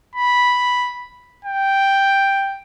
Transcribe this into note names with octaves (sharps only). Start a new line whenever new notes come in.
B5
G5